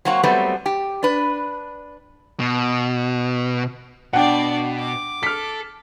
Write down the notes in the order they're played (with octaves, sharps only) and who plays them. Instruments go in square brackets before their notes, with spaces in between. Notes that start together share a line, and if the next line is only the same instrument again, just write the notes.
[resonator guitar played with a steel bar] F#3 A#3 C4 F#4
F#3 G3 A3 B3 C4
G4
D4 B4
[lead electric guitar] B2
[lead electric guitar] B2 [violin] D4 D5 [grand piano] F#5 G5
[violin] D6
[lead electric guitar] A4 [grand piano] F6 B6